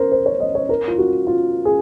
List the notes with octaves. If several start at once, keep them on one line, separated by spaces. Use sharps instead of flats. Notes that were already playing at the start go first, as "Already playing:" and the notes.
Already playing: A#4 C5
C5
C#5
D#5
C#5
A#4
F4
F#4
F4
G#4